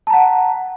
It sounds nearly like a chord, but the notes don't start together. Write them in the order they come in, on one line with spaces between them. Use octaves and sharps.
A5 A#5 F#5